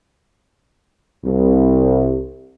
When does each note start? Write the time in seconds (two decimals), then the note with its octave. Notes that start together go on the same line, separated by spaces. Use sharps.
1.25 C2